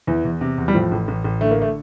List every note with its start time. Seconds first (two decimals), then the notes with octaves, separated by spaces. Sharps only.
0.07 E2 E3
0.25 E2
0.41 C3
0.58 E2
0.68 G3
0.74 A2 F3
0.91 A1
1.08 A1
1.24 A1
1.41 D3 A3
1.51 A#3
1.62 A3